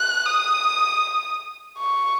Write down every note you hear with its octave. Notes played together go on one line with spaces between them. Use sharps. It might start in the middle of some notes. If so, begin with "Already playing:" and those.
Already playing: F#6
D#6
C#6